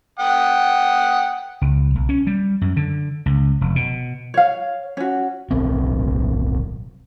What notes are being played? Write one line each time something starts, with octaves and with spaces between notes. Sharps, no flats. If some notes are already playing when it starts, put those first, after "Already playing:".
F#5 G5 D#6
C#2
B1
C#4
G3
F#2
D3
C#2
F1
B2
C#5 F5
C#4 F#4
D1 B1 C4